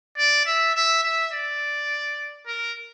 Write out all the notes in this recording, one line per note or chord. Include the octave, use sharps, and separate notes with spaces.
D5
E5
E5
E5
D5
A#4